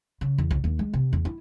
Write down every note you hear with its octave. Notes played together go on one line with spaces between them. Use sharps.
C#3
E2
C#2
D#2
G#3
C3
E2
E4